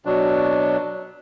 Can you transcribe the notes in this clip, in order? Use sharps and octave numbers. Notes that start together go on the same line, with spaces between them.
B2 F#3 D4